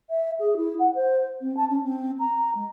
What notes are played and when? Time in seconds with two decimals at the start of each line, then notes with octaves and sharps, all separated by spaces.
0.10 E5
0.40 G#4
0.57 E4
0.79 F#5
0.95 C5
1.41 C4
1.57 A5
1.70 C#4
1.84 C4
2.19 A#5
2.55 G#3